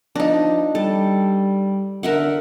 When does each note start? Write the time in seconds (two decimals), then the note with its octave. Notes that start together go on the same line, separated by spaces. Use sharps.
0.15 F3 D4 D#4
0.75 G3 A4
2.03 D3 A#4 E5 F#5